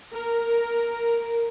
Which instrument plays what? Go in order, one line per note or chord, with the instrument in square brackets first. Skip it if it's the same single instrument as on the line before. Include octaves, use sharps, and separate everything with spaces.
[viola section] A#4